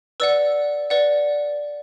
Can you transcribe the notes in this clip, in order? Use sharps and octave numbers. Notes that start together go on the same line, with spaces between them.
B4 D5 F#5 E6
B4 D5 F#5